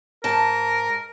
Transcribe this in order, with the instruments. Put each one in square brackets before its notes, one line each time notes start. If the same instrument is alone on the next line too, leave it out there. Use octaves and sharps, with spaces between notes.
[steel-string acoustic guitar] G#2 A5 [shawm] A#4